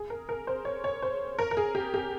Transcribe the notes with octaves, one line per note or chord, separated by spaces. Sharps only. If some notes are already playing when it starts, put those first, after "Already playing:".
Already playing: G#4
A#4
A#4
C5
C#5
C#5
C5
A#4
A#4
G#4
G4
G4